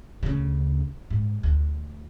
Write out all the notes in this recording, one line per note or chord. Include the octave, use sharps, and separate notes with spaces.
D2 C#3
G#2
D2